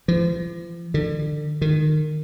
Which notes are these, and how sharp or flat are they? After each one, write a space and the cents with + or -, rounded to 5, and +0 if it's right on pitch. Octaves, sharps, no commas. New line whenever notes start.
F3 -40
D3 +35
D#3 -20